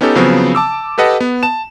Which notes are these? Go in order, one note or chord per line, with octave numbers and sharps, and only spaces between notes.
B3 C#4 D#4 G4 A4
C#3 F3 F#3 B3 C4
A5 D6 E6
G4 A4 B4 D#5 F#5 A5
B3
A5 E7